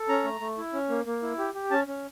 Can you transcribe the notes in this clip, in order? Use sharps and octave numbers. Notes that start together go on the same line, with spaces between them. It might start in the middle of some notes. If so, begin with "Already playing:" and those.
Already playing: A4
C#4 A#5
A3
A3
E4
C#4
A#3
A#3
E4
G4
G4
C#4 A5
C#4